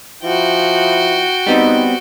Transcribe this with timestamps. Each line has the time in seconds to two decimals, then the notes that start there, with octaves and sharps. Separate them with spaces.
0.23 F3 E4 F#4 G5
1.46 G3 B3 C4 D#4